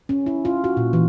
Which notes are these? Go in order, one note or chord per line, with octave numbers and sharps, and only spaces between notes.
C#4
E4
F4
F#4
A#2
E3